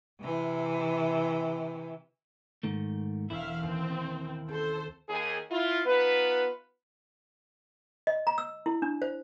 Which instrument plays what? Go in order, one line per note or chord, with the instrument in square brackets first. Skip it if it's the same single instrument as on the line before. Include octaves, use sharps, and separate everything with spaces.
[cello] C3 E3
[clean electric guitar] G#2 D#3 A3
[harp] E1 [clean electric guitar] E4 [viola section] E5 F5
[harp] D#2 [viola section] C4
[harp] C4 [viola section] A4 C5
[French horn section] D#2 G#4
E4 F4
B3 D#4 F4 B4
[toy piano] D#5
A#5
E6
E4
D4
C5